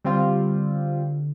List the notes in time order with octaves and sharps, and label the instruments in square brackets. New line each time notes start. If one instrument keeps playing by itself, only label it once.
[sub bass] D3 [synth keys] G3 C4 F4